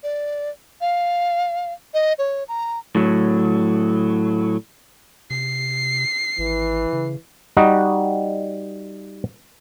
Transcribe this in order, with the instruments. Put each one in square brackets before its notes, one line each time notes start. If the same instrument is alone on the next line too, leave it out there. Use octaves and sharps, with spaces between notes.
[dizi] D5
F5
D#5
C#5
A#5
[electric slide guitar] A2 F#3
[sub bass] C3 [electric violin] C7
[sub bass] G#1 [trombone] E3
[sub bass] C#3
[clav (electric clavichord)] G3 D#4 F#4 D#5 F#5